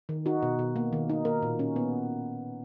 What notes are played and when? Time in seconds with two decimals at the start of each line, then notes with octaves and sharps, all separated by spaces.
0.09 D#3
0.26 D#4 F#4
0.43 B2
0.59 B2
0.76 A#3
0.93 D#3
1.10 D#4
1.25 A#3 A#4
1.42 A#2
1.59 C#4
1.76 B3